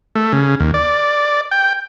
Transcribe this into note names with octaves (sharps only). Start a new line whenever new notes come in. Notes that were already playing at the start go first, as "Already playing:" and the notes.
A3
C#3
D#2
D5
G5